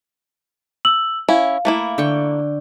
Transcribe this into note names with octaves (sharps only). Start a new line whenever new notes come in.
E6 F#7
C#4 E4 F5
A3 A#3 E4
D3 G5 C#6